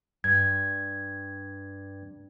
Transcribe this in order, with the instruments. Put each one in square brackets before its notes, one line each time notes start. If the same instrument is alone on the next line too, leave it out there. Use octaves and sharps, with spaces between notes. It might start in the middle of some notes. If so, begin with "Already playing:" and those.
[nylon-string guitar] G2 [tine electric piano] G#6